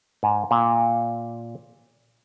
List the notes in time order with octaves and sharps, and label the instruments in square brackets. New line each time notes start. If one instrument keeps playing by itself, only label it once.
[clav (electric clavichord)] G#2
A#2